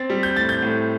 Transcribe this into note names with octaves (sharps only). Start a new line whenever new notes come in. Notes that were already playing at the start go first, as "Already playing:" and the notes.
Already playing: C4 A6
G3
G6
A2 A6
G6
A2